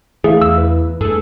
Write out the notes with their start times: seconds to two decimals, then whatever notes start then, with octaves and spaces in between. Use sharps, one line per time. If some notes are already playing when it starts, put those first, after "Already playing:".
0.24 E3 A3 G#4 E5 F5
0.42 E2 E6
0.56 E4 B4
1.01 G2 A3 G#4 A4 E6